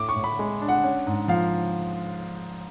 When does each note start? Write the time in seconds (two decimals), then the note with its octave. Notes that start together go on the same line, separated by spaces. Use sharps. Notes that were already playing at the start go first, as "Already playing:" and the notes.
Already playing: A2 D6
0.09 C#6
0.15 A2
0.24 B5
0.39 G#3
0.62 D4
0.69 F#5
0.84 C#4
1.07 G#2
1.28 F3 F5